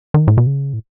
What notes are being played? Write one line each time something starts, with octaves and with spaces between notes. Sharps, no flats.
D#3
A2
B2
C#3
A2